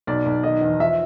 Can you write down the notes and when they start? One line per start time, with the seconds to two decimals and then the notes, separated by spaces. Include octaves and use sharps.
0.07 B1 D5
0.26 B1
0.43 D#3 D#5
0.61 E2
0.80 F3 E5